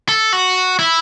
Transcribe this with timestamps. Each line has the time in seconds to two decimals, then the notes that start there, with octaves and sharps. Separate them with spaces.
0.09 A4
0.33 F#4
0.79 E4